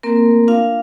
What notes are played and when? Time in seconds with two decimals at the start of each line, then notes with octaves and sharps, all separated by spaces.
0.03 A#3 C4 A#4
0.26 A3
0.48 D4 F4 F5